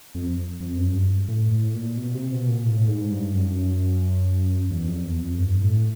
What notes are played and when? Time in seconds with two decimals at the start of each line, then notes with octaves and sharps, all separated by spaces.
0.15 F2
0.60 F2
0.77 F#2
0.94 G2
1.28 A2
1.51 A2
1.74 A#2
1.97 B2
2.14 C3
2.32 B2
2.48 A#2
2.65 A2
2.88 G#2
3.11 G2
3.34 F#2
4.71 E2
4.88 F2
5.04 E2
5.22 F2
5.39 G2
5.62 A2